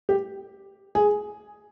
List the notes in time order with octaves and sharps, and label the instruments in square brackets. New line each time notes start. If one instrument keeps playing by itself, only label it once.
[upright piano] G4
G#4